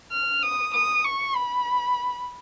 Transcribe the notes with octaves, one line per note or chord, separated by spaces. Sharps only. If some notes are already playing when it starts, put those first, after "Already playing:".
F6
D#6
D#6
C#6
B5